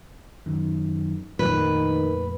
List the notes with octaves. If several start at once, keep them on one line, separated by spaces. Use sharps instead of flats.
F#2 D#3
F2 A#2 D#3 A3 B4